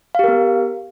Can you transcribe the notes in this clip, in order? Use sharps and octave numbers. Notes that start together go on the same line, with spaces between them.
B3 G4 A#4 F5